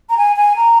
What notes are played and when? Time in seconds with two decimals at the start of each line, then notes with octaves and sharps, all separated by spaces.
0.09 A#5
0.18 G#5
0.36 G#5
0.56 A#5